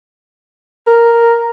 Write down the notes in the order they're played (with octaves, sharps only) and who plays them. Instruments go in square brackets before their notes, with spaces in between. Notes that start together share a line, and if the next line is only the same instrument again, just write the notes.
[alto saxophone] A#4